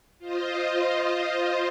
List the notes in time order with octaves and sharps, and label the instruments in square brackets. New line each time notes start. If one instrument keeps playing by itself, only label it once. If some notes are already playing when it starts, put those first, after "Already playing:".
[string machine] F4 C5 D#5